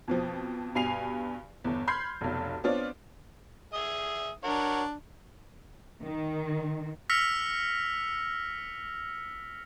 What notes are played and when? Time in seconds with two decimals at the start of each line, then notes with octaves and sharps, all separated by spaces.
0.08 F2 B2 F3
0.75 G2 B2 G#5 C7 F7
1.64 G1 E2
1.87 B5 C6 F6 G6 G#6 C7
2.21 F1 B1
2.64 B3 C4 D4 F4 C#5 D5
3.74 G#4 E5 D#6
4.44 D4 F#4 A#4 C#5
6.02 D#3
7.10 E6 F6 A#6 B6 C#7 F7